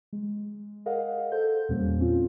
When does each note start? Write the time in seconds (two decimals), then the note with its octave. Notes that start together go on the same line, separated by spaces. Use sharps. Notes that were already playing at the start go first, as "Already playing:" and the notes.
0.13 G#3
0.86 G#4 A#4 D#5 F5 F#5
1.32 A4 C5 G6
1.69 E2 A#2 G3 A#3 C#4
1.99 C4 C#4 F4